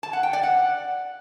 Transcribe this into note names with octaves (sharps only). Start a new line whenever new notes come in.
A5
F#5
G5
D5
F#5